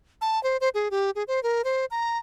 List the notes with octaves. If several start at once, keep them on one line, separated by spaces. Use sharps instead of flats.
A5
C5
C5
G#4
G4
G#4
C5
A#4
C5
A#5